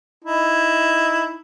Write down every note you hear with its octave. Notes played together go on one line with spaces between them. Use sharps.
D#4 E4